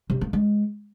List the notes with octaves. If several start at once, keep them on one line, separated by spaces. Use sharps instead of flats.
C3
A#3
G#3